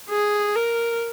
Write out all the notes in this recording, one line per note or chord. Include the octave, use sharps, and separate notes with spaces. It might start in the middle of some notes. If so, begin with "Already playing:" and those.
G#4
A#4